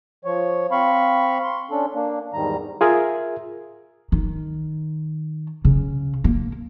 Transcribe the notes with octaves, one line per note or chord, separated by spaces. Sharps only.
F3 C#5
C4 F5 B5 C#6
C6
C#4 D4 A4
A#3 D4
E2 G#2 D#3 G3 A#5
F4 G#4 A#4 E5
D#3
C#3
A#3